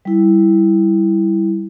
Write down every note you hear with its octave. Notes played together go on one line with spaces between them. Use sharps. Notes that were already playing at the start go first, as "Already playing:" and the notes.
G3 E4